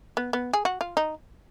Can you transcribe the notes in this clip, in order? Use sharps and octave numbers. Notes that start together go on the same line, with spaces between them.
B3
B3
G#4
F#4
F4
D#4